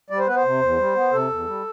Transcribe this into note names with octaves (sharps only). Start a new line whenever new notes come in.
G3 D5
C5
B3 B4
C5
C3
E2
G3
B3
C3 A4
E2
G3